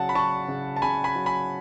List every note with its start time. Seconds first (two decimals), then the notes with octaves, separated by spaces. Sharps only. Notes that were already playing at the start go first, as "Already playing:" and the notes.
Already playing: C#3 F#3 F#5 A5
0.09 B5
0.15 F#3 A5 C#6
0.48 C#3
0.76 A5
0.82 C#3 G#5 B5
1.04 G#5 B5
1.16 F#3
1.26 G#5 B5